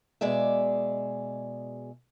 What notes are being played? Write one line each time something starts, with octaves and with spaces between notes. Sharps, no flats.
B2 G#3 G#4 D5 E5